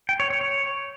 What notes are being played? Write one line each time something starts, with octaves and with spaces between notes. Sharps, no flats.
G5
C#5
C#5
C#5